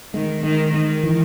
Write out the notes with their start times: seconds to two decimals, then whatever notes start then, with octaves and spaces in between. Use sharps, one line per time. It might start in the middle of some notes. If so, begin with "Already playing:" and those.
0.14 D#3 G#3
0.43 D#3 G#3
0.73 D#3 G#3
1.04 E3